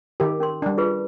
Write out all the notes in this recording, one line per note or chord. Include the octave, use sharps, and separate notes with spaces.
D#3 G4 A#4
C#4 A#4 C6
G3 D4
F4 G#4 B4